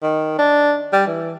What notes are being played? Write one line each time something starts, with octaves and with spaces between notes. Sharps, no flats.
D#3
D4
G3
E3